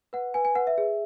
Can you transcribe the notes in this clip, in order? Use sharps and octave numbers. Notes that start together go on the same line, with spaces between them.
B4 F#5
B4 G#5
G#5
B4 F#5
E5
G#4